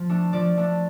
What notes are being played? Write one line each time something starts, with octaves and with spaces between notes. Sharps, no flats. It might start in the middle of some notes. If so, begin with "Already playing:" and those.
Already playing: F3
A3 D4
F3 D5
A3 D4